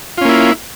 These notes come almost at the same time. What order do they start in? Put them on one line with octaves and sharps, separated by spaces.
F4 C#4 A#3 E4